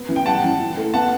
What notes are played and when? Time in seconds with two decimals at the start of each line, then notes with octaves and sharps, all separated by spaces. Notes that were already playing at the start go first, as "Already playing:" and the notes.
Already playing: B3
0.09 E3
0.16 G5
0.26 G3 F#5 A5
0.44 E3
0.59 E4
0.77 A3
0.94 B3 F#5 A5